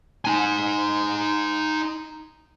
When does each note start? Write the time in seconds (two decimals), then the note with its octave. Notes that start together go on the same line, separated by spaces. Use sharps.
0.25 D#4 G#5